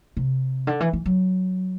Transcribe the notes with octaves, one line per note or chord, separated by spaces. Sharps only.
C3
D3
E3
E3
F#3